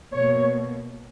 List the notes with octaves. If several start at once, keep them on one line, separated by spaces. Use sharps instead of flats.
B2 A#3 C#5